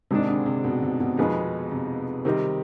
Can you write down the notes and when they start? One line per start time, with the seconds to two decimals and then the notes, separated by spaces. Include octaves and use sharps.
0.11 G#1 G#2 C3 D#3 G#3 D4
0.29 D3
0.46 C3
0.64 B2
0.82 C3
1.00 B2
1.17 F2 B2 D#3 G#3 B3 D#4
1.71 C3
2.25 C3 D#3 G3 C4 D#4 G4